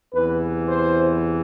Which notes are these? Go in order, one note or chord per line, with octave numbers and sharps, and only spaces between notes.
E2 C3 E3 B4
C5